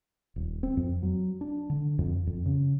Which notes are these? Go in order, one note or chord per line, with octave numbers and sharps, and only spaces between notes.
D#1
C4
F2
F#3
D4
D3
F2
F2
C#3